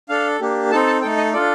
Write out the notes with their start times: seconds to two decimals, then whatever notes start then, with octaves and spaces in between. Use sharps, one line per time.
0.09 D4 A4 F5
0.40 A#3 D4 G4
0.71 C4 D#4 A4 A5
0.86 A5
1.02 A3 D#4 A4 G5
1.17 D#5
1.33 D4 F4 A4 D5